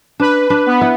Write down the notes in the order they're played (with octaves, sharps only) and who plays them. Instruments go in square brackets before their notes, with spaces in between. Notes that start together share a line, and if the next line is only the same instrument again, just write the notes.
[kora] D4 [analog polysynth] B4
[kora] D4
[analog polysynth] B3
[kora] E4